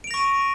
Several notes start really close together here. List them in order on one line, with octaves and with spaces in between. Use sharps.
D7 F7 A#6 C#6 D#7